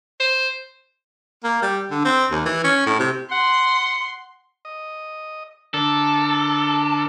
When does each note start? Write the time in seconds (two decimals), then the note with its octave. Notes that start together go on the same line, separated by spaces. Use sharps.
0.20 C5
1.44 A#3
1.62 G3
1.91 D3
2.05 C4
2.31 D#2
2.45 E3
2.64 C#4
2.86 A2
2.99 C3
3.31 F#5 C6
4.65 D#5
5.74 D3 D4 A4 A#4